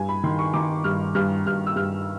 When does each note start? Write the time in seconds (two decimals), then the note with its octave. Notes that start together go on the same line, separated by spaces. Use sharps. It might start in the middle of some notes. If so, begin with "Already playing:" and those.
Already playing: G2 G#5
0.09 B5
0.24 D#3 C6
0.39 C#6
0.54 D#3 D6
0.84 G2 F6
1.15 G2 F6
1.46 G2 F6
1.66 E6
1.76 G2 F6